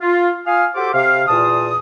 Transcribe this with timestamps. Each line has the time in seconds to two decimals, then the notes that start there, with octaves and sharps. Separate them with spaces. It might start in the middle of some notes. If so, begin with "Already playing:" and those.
0.01 F4
0.47 F4 F5 G#5 D#6 F6
0.76 F#4 G4 A4 C5 D6
0.94 C3 F5
1.28 E2 A#2 A5 D#6